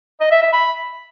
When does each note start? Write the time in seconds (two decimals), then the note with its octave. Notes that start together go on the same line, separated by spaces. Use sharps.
0.21 D#5
0.31 E5
0.42 E5
0.53 B5